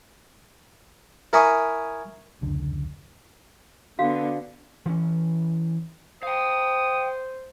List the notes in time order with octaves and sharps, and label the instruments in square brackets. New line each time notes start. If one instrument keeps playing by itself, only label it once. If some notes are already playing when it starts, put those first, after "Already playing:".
[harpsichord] E4 A#4 E5 G#5 C#6 D#6
[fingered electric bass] F1 C#2 F#2 D3
[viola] D3 B3 [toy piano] F#4 F5
[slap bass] E3 C#4
[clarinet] C5 [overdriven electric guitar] F5 G5 [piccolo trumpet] D#6